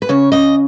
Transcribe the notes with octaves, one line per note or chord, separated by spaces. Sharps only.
B4
C#3 C#5
C#3 D#5